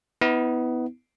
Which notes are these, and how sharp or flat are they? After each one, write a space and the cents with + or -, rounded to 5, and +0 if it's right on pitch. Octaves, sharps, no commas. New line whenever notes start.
B3 +15 E4 -30